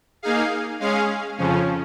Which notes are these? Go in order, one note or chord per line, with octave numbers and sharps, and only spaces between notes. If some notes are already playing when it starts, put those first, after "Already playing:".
A#3 D#4 G#4 F5
G#3 C#4 G#4 F5
F2 C#3 F3 C#4